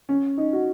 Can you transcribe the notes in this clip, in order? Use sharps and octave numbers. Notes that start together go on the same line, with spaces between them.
C#4
D#4
F#4